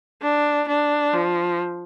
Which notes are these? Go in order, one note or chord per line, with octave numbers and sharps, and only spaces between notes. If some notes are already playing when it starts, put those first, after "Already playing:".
D4
D4
F3